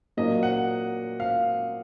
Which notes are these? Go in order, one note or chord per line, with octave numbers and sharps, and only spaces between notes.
A#2 F#3 A#3 D#5
F#5
F5